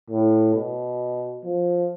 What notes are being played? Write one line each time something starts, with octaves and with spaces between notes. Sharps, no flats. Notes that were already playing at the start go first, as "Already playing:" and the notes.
A2
B2
F3